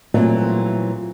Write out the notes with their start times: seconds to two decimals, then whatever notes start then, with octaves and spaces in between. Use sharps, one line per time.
0.14 A#2 E3 F#3 G3 A3 C4